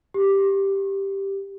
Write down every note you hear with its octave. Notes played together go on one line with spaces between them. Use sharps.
G4